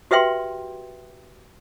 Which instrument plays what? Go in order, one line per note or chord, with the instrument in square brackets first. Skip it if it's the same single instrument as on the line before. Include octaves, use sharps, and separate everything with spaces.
[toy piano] F#4 G4 B4 E5 G5 C6